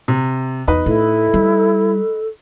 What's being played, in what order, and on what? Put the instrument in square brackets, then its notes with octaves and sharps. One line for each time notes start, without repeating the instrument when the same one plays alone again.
[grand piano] C3
[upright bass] E2 [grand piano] D#4 B4
[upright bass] A2 [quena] E4 [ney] A4
[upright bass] G3